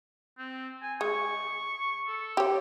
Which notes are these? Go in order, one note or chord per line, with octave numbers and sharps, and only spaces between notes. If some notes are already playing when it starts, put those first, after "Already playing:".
C4
G#5
G#3 C#6
A4
G4 C#5